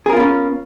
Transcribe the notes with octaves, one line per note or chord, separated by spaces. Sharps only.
B3 C#4 F4 G#4 A#4